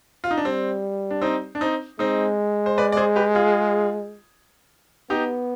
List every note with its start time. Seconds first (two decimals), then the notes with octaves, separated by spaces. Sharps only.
0.24 F4
0.31 D#4
0.37 D4
0.44 G3 C4
1.11 D4
1.21 C4 D#4
1.55 D4
1.61 C4 D#4
1.99 G#3 C4 D#4
2.66 C5
2.78 B4 D5
2.92 D5
2.97 G#4 C5
3.16 G4 B4
3.35 F4 G#4
5.10 B3 D#4 G4